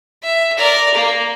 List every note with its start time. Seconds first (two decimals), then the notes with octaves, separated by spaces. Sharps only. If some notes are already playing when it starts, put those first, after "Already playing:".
0.23 E5
0.57 A#4 D5
0.94 A#3